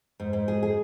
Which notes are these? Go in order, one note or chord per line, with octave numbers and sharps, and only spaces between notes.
G#2
G#2
G#4
G#4